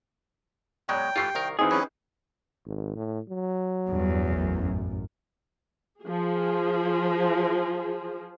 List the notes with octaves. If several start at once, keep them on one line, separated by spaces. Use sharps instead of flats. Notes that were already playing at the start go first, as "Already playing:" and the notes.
B2 F#3 G#3 C#5 D5 G5 A#5
E3 A3 F4 G4 C#6 C7
C2 D#3 A#4
E3 C4 D#4 G#4
F#3 C#4 B4
G#1
A2
F#3
E2 G2
A1 F#2
F3 G#4